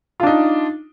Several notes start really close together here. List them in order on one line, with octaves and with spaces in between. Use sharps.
F4 D4 D#4